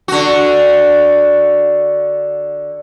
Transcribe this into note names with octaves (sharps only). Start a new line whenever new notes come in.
D3 F#4